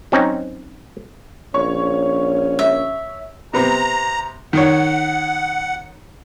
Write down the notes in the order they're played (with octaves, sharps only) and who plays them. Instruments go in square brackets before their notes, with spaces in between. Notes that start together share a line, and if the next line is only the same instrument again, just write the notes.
[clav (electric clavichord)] F#3 C4 C#4 D#4
[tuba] A#1 [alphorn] C#4 [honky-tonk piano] C#5 C#6
[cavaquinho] E5
[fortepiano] C3 B3 C4 [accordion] A#5
[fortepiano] D#3 C#5 [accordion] F#5